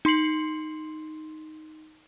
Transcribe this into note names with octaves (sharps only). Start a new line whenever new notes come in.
D#4 C6 C7 F#7